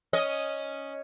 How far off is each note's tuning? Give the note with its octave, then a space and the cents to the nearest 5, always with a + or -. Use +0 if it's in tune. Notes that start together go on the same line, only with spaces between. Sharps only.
C#4 +0 D#5 +0